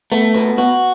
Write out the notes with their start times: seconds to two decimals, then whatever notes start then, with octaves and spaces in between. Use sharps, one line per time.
0.12 A3 B3
0.34 B2 B3
0.58 B3 F#4